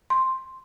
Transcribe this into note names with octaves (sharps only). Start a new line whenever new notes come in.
C6